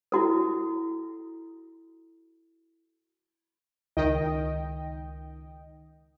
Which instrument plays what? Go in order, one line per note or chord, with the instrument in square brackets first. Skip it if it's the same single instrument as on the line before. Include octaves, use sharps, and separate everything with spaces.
[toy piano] E4 F#4 A4
[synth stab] C#2 D#3 D#5 G5